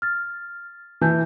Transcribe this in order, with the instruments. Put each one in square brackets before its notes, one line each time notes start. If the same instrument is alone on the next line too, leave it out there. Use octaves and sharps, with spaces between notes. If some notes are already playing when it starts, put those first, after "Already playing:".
[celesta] F6 A6
[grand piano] E3 [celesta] G#5 A5 G6